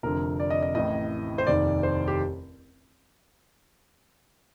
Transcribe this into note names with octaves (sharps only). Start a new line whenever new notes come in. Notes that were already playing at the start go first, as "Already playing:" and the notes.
F1 F2 D3 A#4
D5
D#5
D#5
A1 A2 D#5
C5
F1 D#2 D#3 D5
C5
G4